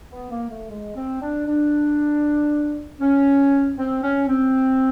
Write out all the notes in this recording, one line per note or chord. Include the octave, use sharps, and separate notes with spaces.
B3
A#3
A3
G#3
C4
D4
D4
C#4
C4
C#4
C4